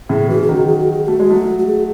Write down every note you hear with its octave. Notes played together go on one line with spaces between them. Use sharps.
A2 C#3 G#4
C#3 E3 F#4
G#4
D#3 F#3
F#4
G#4
F#4
G#4
G#4
A3 F#4
G#3
F#3 A3
F#4
G#4